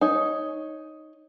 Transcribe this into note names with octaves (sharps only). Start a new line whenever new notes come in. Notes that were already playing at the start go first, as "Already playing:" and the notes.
D#4 C#5